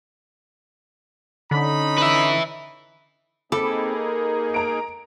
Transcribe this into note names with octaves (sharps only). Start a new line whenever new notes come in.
D3 C#4 D#4 B5
B4 E5
A#3 C4 D#4 G#4 A4 B5 D6
A#4
A#5 D7